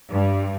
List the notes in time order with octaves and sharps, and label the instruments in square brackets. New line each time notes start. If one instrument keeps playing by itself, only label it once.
[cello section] G2